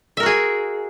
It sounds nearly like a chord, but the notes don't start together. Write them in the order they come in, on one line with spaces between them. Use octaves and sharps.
E5 A#4 F#4 G#4